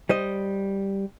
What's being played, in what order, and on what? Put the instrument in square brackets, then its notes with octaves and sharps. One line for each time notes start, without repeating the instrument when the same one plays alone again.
[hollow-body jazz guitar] G3 C5 D#5